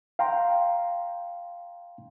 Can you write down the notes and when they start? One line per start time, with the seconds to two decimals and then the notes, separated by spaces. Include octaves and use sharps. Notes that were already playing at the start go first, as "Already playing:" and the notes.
0.19 F5 G5 A#5 C6